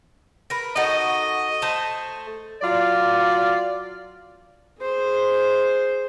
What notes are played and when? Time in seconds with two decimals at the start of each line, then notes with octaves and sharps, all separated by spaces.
0.50 A#4 B4
0.76 D#4 F#4 A4 D#5
1.62 A3 C5 A5
2.62 F#3 F4 D5
4.80 G#4 C5